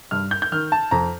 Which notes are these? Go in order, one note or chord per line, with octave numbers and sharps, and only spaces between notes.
G2 F6
G6
G6
D#3 F6
A5
F2 A#5